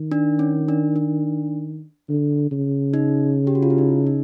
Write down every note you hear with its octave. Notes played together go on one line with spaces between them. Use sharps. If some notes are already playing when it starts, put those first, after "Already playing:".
Already playing: D#3
D4
C#4
D4
D4
D3
C#3
D#4
G4
F#4
F4
E4
D#4
D#4